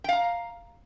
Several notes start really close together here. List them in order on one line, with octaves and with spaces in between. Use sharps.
G5 F5 A#5